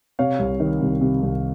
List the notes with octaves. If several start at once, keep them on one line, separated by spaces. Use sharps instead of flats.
C3 C#5 F5
C2
D#3
C2
C3
C2